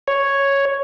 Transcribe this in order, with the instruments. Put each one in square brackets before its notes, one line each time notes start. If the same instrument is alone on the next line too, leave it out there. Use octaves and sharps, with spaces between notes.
[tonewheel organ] C#5